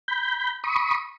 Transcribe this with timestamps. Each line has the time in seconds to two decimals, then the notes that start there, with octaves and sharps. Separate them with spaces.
0.08 B5 G6
0.64 B5 C#6 D#6